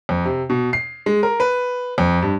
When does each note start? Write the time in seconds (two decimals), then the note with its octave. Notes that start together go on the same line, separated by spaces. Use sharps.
0.09 F2
0.25 C3
0.50 B2
0.73 C7
1.06 G#3
1.23 A#4
1.40 B4
1.98 F2
2.22 G2